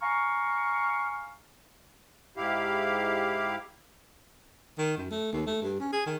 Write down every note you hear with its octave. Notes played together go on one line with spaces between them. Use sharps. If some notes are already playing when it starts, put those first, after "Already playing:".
F5 G#5 A#5 C#6 F6
G#2 E4 G4 F5
D#3
F#2
A3
D#2
A3
G2
C#4
G#4
D#3